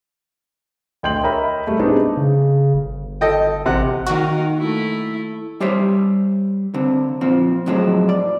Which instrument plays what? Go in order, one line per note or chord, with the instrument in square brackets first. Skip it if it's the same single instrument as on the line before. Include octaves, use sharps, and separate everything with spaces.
[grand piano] D2 D#5 G5 C6 G6 F#7
A#4 C#5 D#5 E5 A#5 B5
G3 A3
G#3 B3 C4 D4 D#4
[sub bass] C#3
G1
[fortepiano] A4 D#5 G5
[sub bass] A1 [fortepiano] C3 F#5
[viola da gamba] D#3 A#3 D#4 [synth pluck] F#4
[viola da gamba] A3 E4
[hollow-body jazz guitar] G3 G4 C5 C#5 E5
D3 C4
A#2 F3 C4
F2 A2 F#3 G#3 C4
D5